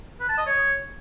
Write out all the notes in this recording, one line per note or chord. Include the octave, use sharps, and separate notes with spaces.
B4
A5
D#5
C#5